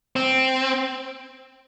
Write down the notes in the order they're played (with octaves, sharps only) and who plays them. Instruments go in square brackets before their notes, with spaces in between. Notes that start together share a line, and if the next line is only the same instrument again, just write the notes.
[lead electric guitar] C4